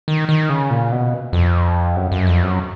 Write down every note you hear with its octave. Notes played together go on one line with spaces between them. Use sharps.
D#3
D#3
C#3
A#2
B2
F2
F#2
F#2
F2
F#2